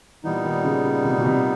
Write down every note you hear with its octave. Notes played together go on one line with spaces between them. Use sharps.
A#2 E3 G3 B3 D#4
D#3
C#3
C#3
C3
B2
C3